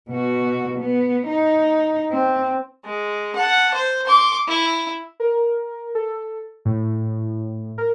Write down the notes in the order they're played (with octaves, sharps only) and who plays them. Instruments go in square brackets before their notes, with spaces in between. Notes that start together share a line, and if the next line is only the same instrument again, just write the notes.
[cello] B2 F#4
B3
D#4
C4
[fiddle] G#3
F#5 A5
C5
C6 D6
E4
[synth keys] A#4
A4
A2
A#4